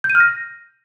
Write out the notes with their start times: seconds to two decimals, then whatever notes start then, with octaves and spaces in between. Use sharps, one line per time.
0.04 G6
0.10 D#7
0.15 F6
0.20 A#6